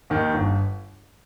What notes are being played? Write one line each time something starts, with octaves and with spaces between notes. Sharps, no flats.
D#2 D#3
G1